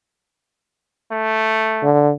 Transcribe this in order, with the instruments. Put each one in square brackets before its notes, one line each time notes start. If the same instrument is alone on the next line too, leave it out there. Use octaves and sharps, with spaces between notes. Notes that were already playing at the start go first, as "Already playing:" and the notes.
[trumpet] A3
[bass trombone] D3